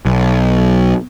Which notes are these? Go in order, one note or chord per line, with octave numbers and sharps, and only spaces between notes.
B1